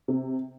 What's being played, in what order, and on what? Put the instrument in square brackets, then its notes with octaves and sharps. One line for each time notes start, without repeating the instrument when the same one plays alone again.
[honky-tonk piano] C3